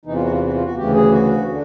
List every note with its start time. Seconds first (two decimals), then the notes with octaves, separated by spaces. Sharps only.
0.05 E2 C3 E3 D#4
0.14 F4
0.24 F#4
0.32 F4
0.47 F#4
0.53 F4
0.64 F#4
0.76 D2 C#3 E3 G4
0.94 G#4
1.12 F#4
1.49 D3